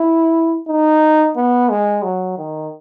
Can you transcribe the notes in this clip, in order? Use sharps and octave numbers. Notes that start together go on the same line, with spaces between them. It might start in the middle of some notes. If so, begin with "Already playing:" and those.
Already playing: E4
D#4
B3
G#3
F#3
D#3